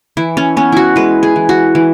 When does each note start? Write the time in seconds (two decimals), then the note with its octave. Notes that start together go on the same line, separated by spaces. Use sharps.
0.17 E3 E4
0.37 C#4
0.57 B3 C#4
0.72 E4 F#4
0.96 G#3 B4
1.23 G#4
1.36 E3
1.49 F#4
1.75 E3